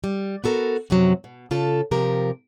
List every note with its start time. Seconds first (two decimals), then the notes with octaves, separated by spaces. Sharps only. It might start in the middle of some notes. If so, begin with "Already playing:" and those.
0.04 G3
0.44 B3 F#4 A4 A#4
0.90 F#2 C3 F3 F#3
1.24 B2
1.51 C#3 F4 A4 A5
1.91 C3 F3 G4 A#4